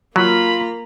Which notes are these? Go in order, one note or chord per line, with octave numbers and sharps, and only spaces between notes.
F#3 A#3 F4 A#5 B5